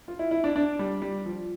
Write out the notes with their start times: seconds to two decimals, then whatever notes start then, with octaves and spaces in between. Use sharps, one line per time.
0.08 F4
0.19 E4
0.31 E4
0.44 D4
0.56 D4
0.79 G3
1.02 G3
1.26 F3